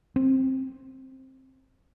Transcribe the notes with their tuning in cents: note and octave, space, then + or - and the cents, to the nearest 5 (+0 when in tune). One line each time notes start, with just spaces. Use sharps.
C4 +10